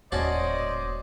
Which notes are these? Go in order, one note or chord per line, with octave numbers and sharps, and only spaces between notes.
D#1 A2 C#4 F#4 C5 D5 D#5 A5